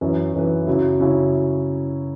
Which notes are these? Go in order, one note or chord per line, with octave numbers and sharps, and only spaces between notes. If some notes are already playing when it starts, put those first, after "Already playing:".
F#2 E3 C#4 E4 B4
F#2 E3 C#4 E4 B4
F#2 C#3 F#3 C#4 E4
F#2 C#3 F#3 C#4 E4